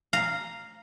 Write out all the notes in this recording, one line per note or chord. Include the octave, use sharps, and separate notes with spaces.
F5 A#5